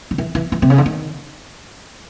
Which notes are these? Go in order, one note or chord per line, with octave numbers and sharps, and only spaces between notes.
D#3
E3
E3
E3
C3
C#3
D3
D#3